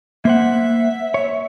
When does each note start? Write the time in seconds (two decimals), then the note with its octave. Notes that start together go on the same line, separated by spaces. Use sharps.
0.25 A#3 C5 E5 F#5
1.14 C#5